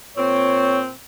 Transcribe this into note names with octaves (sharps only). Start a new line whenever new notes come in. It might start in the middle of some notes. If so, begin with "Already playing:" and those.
A#2 C4 C#5